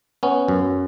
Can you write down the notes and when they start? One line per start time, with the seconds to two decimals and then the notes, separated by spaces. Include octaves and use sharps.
0.23 B3 C#4
0.48 F#2